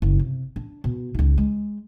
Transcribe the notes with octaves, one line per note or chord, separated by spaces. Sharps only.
F#1
C3
D4
B2
C#2 D#3
G#3